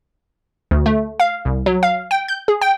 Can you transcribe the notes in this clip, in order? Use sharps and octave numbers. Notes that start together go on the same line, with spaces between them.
D2
A3
F5
C2
F#3
F5
G5
G6
G#4
G5